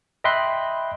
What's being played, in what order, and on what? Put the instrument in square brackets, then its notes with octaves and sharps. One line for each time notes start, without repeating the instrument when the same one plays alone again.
[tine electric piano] D#5 E5 G5 B5 C6 F#6